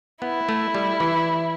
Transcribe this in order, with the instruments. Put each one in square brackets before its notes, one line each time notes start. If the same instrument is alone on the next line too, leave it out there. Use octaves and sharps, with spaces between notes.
[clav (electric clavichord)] B3 [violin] E4
[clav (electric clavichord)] A3
G3
E3